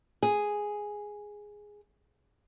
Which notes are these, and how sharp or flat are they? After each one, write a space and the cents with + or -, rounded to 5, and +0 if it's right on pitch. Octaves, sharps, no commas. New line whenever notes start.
G#4 +0